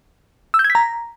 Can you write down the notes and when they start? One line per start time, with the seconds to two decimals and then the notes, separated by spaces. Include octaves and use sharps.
0.54 E6
0.59 G6
0.64 G#6
0.70 B6
0.75 A#5